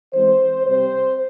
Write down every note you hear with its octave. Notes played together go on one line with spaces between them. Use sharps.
E3 G#3 C4 C5
C3 G3 C4 C5